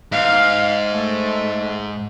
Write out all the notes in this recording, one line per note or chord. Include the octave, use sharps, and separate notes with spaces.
G#2 F5
A3